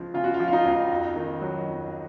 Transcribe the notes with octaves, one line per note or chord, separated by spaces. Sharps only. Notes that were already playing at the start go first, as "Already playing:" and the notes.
Already playing: C#2 F3
C#3 F4
F#4
F4
F3
F4
D#4
C#2
F2
D#3
F#3
F2